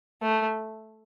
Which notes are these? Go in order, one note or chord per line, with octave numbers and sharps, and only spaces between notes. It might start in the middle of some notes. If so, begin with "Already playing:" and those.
A3